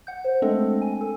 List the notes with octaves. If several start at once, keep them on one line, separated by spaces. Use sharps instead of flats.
F#5 G6
C5
G#3 A3 C4 D4 A4 D#5
G#5
A4